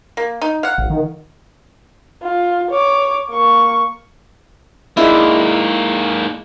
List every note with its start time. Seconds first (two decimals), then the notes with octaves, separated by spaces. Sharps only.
0.17 A#3
0.42 D#4
0.63 F5 F#5
0.78 A1
0.90 D#3
2.23 F4
2.70 C#5 D6
3.30 A#3 C#6
4.97 G#2 G#3 A#3 D4 E4